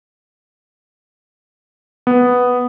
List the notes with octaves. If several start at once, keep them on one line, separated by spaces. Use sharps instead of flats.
B3